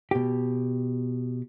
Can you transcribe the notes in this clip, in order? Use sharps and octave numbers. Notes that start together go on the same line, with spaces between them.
B2 G4